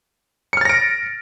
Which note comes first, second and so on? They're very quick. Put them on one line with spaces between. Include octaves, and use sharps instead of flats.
C#7 F6 A6 A#6 D7